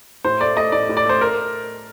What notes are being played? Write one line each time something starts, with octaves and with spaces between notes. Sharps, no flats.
A2 C5
A3 D5
A3 D#5
A2 D5
A2
D5
A3 C5
A#4